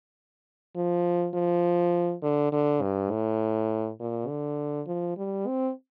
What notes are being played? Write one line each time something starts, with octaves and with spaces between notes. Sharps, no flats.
F3
F3
D3
D3
G2
A2
A#2
D3
F3
G3
C4